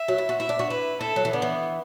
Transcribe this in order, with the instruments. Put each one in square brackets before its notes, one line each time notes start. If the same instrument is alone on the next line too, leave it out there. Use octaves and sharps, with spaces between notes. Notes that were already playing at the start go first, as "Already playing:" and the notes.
Already playing: [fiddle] E5
[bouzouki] F#3
E4
F#4
[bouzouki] E4 [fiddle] E5
[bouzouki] D4
F#4
[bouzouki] E4 [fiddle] B4
[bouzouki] E4 [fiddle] A4
[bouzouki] F#3
E3
[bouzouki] D3 [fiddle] B3
[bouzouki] E3